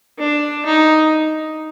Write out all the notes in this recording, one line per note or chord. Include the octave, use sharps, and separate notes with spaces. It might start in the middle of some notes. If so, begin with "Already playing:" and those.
D4
D#4